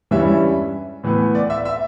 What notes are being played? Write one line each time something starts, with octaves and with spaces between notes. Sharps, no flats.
G2 E3 G3 C#4 E5
A2 E3 B3
D5
E5
E5